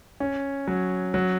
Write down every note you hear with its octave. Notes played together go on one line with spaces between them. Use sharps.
C#4
F#3
F#3